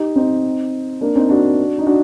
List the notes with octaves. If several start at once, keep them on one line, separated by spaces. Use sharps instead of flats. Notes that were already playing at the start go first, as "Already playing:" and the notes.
Already playing: D#4 G4
C4 D#4
A#3 D4
C4 D#4
D4 F#4
D#4
D4 F#4